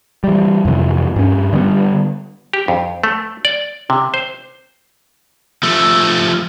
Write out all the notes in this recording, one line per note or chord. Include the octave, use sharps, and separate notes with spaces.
E3 G3
F2 C3 E3
G2 C#4
D3 G3 G#3 B3
G4
F2
A3
D5
C3
C5
F3 A3